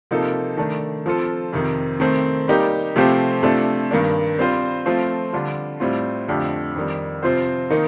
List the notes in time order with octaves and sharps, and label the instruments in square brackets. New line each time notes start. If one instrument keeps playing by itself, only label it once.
[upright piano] C3 F3 A#3 D#4 A4
D#3 A3 D4
F3 C4 F4 A4
F2 C3 D#3
D#3 A3 C4
G3 A#3 D#4 G4
C3 F3 A3 C4 G4
C3 F3 A3 D4 A4
G2 D#3 A#3 D4
G3 C4 F4 C5
F3 A3 C4 F4
D3 G3 D4 F4
A2 G3 C4 F4
F2 D3 A3 D4 G4
F2 D#3 G3
C3 F3 C4 F4 C5
D#3 A#3 D#4